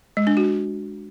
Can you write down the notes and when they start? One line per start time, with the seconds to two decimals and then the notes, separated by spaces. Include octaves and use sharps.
0.17 G#3
0.27 D4
0.37 F#4